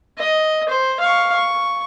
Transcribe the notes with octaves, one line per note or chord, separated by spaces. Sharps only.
D#5
C5
F5 C#6
C#6